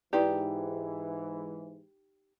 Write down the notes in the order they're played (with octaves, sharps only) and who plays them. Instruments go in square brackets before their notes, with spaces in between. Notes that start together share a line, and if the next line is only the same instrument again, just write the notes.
[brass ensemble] G#2 E3 [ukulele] D#4 G4 [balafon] E4 B4 D5